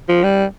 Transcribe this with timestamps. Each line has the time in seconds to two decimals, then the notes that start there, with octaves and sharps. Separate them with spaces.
0.09 F3
0.24 G3